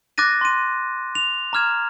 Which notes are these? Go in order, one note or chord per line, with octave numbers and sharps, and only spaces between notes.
D6 F#6 A6 A#6 D#7
C6 D#7
F7
A#5 D6 F6 G#6 E7